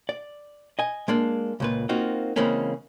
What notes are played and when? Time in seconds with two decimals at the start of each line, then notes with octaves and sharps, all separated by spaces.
0.09 D5
0.79 D#5 G#5
1.08 G#3 A#3 D4
1.60 C#2 A#2 B4
1.89 A#3 C4 D#4 F4 F#4
2.36 C#3 E3 G#3 A#3 C4 C#4